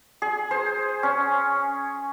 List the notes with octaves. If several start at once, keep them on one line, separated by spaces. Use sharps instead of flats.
G#4
C5
C#4